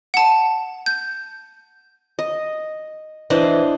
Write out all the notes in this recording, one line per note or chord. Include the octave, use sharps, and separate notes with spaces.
F#5 A5
G6
D#5
E3 D4 C5 D#5